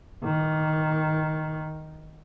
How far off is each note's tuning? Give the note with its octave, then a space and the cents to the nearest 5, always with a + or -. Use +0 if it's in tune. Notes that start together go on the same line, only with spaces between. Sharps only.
D#3 +5